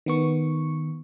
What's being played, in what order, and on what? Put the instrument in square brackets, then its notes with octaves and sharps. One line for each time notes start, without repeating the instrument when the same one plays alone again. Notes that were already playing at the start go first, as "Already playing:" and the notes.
[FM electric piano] D#3 B3 C#6